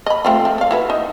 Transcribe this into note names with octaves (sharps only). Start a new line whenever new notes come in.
D#5 B5
A3 C4 F4
F3
A4 F5
E4 F#4 B4
D#4